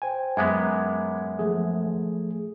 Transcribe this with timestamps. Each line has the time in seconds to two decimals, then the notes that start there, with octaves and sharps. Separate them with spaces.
0.02 C5 G5 G#5
0.37 F#2 G#3 B3 A#5 D6 G#6
1.39 F3 A3 G#4